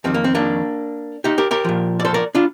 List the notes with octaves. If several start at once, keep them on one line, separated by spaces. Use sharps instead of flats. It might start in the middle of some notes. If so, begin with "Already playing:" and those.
F2 D#3 G3 C4
A#3
C4
A#3 D4
D#4 G4
G4 A#4
G4 A#4
A#2 F3
D5
A4 C5
A#4 D5
D4 F4